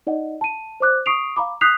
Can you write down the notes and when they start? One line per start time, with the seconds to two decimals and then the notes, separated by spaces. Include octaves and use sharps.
0.07 D#4 D5 D#5 F#5
0.41 A5 D#7
0.80 C5 D5 D6 F#6
1.06 C#6 D#6 C7 D7 F7
1.36 F5 A#5 B5 D6
1.61 D#6 F#6 G6 B6 C7 F7